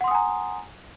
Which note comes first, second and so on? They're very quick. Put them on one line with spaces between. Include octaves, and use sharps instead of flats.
F#5 C6 D#6 G#5 A#5